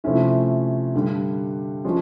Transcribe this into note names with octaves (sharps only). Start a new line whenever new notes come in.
C3 F3 A3 C#4 E4
G2 D3 G3
F3 G#3 C#4 F#4